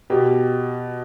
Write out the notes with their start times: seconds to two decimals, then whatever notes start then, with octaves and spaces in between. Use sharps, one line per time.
0.10 B2 G4